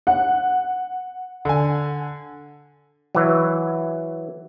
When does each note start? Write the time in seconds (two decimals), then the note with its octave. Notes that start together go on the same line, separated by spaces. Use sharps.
0.07 F#5
1.45 D3 G#5
3.15 E3 F#3